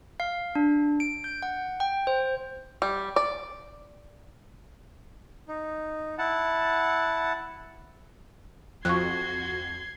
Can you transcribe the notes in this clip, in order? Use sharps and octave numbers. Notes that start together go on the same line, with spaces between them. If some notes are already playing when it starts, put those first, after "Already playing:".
F5
D4
D7
G6
F#5
G5
C5
G3
D5
D#4
E4 F#5 A5
F2 F#4 C6 C#6 F#6 G#6